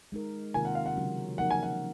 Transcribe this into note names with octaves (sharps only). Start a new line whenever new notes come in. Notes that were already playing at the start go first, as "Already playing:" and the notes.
G#3 D#4 A#4
C3 D#3 A#3 F4 A#4 G#5
F#5
F5
F#5
C#3 F#3 C#4 F#4
F3 A#3 D#4 A#4 F#5
G#5
F#5